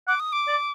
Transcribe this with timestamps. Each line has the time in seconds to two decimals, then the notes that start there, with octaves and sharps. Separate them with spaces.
0.08 F#5 D6
0.20 D#6
0.33 D6
0.48 D5